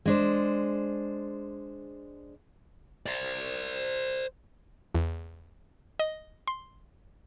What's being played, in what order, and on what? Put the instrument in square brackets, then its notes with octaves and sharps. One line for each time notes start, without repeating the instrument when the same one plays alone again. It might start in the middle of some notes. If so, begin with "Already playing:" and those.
[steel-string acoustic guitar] G#3 D4 C5
[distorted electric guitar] C5 D5
[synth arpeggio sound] E2
D#5
C6